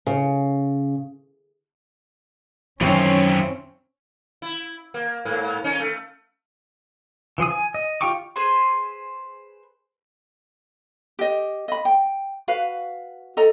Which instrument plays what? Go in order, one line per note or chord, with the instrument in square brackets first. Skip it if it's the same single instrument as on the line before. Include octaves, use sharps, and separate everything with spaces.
[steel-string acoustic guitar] C#3
[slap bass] F#2 D#3 E3 [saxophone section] C4 [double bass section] C#4 [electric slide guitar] E4 F4 C#5
[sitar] E4
A#3
G#2 A#3
C#4 D#4
A3
[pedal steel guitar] E3 F3 G#4 D#6
G#5
D#5
F4 G4 G5 C#6 D6
[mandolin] G#4 B4 C5 C6
[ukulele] G4 D#5
D#5 B5
G5
F#4 B4 F5
A4 D#5 A#5